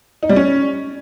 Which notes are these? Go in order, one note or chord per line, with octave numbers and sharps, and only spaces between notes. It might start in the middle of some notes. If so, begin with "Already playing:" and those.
D#4
G3
C#4